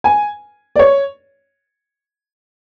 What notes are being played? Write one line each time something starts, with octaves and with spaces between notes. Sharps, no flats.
G#5
D5
C#5